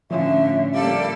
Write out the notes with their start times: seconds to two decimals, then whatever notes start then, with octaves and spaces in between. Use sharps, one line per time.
0.11 A2 D3 F3 C#4 F4 E5
0.74 G3 A#3 A4 D5 F5